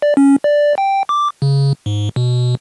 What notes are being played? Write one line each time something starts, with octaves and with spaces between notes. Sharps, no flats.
D5
C#4
D5
G5
D6
C#3
G#2
B2